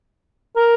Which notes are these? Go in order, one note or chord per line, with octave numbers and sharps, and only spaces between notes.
A#4